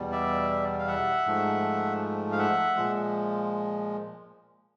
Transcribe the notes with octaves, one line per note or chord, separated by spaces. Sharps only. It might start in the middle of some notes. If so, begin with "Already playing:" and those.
Already playing: E2 B2 G3
D5 E5
F5
E5 F#5
G#2 F3 A3
F5
E5 F#5
A#2 F3 G#3